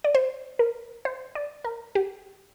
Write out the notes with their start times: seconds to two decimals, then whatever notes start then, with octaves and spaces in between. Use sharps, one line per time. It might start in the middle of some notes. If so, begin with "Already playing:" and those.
0.04 D5
0.15 C5
0.59 A#4
1.05 C5
1.35 D5
1.65 A#4
1.95 G4